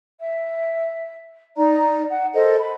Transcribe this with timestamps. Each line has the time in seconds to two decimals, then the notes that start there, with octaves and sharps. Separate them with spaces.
0.19 E5
1.57 D#4 D5 A#5
2.10 F#5
2.34 A4 A#4 C5 D#5
2.60 B5